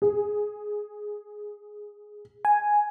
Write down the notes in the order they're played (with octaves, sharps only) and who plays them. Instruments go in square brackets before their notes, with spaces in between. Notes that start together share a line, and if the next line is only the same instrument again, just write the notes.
[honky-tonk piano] G#4
[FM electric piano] G#5